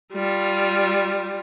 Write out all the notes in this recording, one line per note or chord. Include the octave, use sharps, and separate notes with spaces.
G3 F4